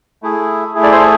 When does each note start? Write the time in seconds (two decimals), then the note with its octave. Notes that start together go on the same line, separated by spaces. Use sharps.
0.22 A3 E4 G#4
0.75 A3 E4 G#4
0.83 D5
0.92 A4 C5